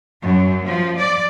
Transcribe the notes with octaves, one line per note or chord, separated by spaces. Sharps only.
F#2
F3
D5